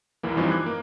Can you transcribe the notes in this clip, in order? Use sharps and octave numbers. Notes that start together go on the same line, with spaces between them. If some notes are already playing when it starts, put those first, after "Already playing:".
B1 E2 E3 A#3
G2 E3 F3 C4 D#4
D6 F#6 G#6
A#3